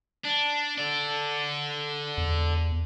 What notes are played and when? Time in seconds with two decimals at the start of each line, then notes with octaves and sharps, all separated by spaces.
0.25 D4
0.78 A4 D5
2.18 E2